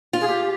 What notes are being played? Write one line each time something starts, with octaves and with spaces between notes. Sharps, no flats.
F4
G#4
G4